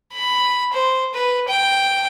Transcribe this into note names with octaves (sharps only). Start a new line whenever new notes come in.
B5
C5
B4
G5